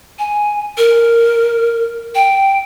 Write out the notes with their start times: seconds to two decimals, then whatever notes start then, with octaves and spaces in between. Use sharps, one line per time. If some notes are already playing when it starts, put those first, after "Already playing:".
0.19 G#5
0.77 A#4
2.15 G5